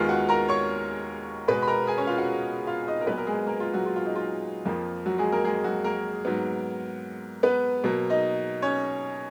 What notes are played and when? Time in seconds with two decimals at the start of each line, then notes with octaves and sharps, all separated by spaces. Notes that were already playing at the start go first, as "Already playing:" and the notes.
Already playing: D#2 D#3 G#3 B3 F4 F5
0.09 F#4 F#5
0.29 A#4 A#5
0.48 C#5 C#6
1.48 B2 G#3 B3 B4 B5
1.63 B5
1.68 A#4 A#5
1.87 G#4 G#5
1.98 C#4 C#5
2.07 F4 F5
2.18 F#4 F#5
2.67 F4 F5
2.87 D#4 D#5
3.01 A#4
3.06 A#2 F#3 A#3 B3 B4
3.18 A#4
3.27 G#3 G#4
3.47 A#3 A#4
3.60 F4
3.74 F#3 F#4
3.86 F4
3.96 F4
4.06 D#4
4.16 F4
4.65 F2 F3 A#3
5.06 F#3 F#4
5.18 G#3 G#4
5.32 A#3 A#4
5.44 G#3 G#4
5.64 F#3 F#4
5.84 A#3 A#4
6.25 G#2 F#3 B3
7.43 B3 B4
7.84 B2 F#3 A#3
8.10 D#4 D#5
8.62 C#4 C#5